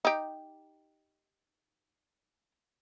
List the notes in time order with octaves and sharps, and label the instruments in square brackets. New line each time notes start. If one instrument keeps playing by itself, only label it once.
[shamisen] D#4 G4